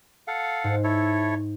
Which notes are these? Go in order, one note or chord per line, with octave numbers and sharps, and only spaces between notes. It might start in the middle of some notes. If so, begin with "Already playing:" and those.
A4 F5 F#5
G#2
E4 A4 C#5